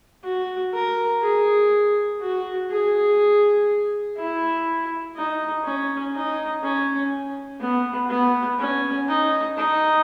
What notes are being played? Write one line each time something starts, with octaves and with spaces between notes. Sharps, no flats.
F#4
A#4
G#4
F#4
G#4
E4
D#4
C#4
D#4
C#4
B3
B3
C#4
D#4
D#4